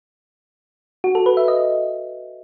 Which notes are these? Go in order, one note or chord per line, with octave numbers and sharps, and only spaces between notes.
F#4
A4
B4
E5
D#5